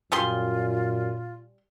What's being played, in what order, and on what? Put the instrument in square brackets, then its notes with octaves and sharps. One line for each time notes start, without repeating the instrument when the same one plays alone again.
[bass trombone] F#2 [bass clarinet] A#2 [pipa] G3 G#4 C6 [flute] F4